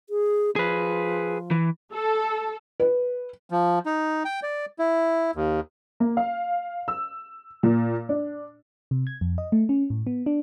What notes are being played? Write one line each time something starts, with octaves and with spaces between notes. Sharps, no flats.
G#4
F3 G#4 B4
E3
A4
B4
F3
D#4
G5
D5
E4
D#2
A#3
F5
E6
A#2
D4
C3
G#6
F2
D#5
A3
C#4
A2
B3
D4